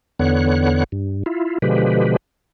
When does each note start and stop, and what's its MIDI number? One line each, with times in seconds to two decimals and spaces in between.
0.19 0.84 40
0.19 0.84 50
0.19 0.84 59
0.19 0.84 73
0.19 0.84 90
0.92 1.23 43
1.26 1.58 64
1.26 1.58 65
1.62 2.16 47
1.62 2.16 50
1.62 2.16 53
1.62 2.16 56
1.62 2.16 67
1.62 2.16 71